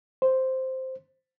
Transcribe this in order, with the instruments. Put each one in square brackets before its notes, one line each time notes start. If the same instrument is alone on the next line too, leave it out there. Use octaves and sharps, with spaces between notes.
[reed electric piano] C5